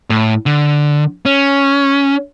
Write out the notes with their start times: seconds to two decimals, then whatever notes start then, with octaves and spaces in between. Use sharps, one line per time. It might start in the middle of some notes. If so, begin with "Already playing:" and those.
0.10 A2
0.46 D3
1.26 C#4